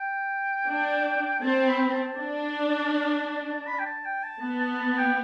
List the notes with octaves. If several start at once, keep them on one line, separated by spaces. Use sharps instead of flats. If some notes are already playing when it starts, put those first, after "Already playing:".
Already playing: G5
D4
C4 A5
B5
A5
D4 A5
B5
G5
A5
G5
A5
B3 A5
A5
A5
G5